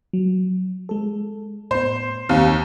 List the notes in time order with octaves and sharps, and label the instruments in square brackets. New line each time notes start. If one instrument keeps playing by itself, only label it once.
[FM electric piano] F#3
G#3 A4
[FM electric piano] A2 B3 [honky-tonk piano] C5
[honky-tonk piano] D#2 [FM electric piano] C4 F5